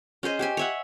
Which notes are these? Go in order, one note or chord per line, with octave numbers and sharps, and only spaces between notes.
C#4 G#4 C5 D#5
G4 C5 G#5
C#5 E5 F#5